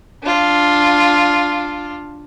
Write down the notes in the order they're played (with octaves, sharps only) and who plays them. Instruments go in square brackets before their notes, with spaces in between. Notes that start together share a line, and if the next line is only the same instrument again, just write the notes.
[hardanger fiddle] D4 F4